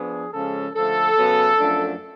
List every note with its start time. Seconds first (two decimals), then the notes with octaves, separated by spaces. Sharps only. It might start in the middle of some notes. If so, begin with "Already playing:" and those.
Already playing: F3 B3 D4 G#4
0.33 C#3 F3 G#3 C#4 A4
0.75 D3 F3 A3 A4
1.17 C#3 F#3 B3
1.60 F#2 F3 A3 D4